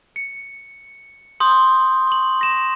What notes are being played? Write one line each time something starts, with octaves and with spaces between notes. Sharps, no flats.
C#7
C6 D#6 G6
C#6 F#7
A#6 E7